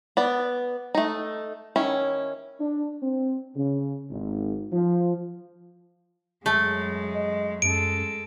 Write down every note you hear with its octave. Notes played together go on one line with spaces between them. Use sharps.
B3 D5
A3 D#4
D#3 C#4 E4
D4
C4
C#3
G#1
F3
F#2 G#3 A3
D#5
F#2 G#3 A4 D7